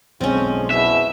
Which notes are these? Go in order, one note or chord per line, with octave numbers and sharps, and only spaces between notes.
B1 F2 D3 F3 G#3 C4 C#4
E2 B2 E4 E5